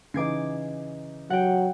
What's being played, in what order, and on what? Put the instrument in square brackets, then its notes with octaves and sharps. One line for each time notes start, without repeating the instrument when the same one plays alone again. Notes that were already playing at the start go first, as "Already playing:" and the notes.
[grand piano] C#3 E3 D#4 [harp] D6 G#6 C7
[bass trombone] F#3 [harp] F#5 G5